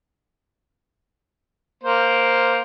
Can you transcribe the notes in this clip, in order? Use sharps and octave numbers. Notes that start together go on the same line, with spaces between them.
A#3 C5